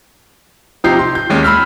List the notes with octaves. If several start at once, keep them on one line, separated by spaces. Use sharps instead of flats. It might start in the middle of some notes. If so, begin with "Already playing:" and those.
C3 F3 D#4 G4 G6 C7
C6
G6
D#2 G#3 C#4
B5 E6 F6 B6